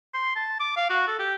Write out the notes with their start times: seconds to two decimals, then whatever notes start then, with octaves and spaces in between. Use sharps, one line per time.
0.14 C6
0.36 A5
0.60 D6
0.77 F5
0.90 F#4
1.08 A4
1.19 G4